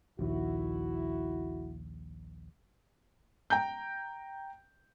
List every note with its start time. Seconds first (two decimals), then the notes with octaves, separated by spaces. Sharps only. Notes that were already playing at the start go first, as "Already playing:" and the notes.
0.19 A#1 D#2 E4 F#4
3.50 G5 A#5 G6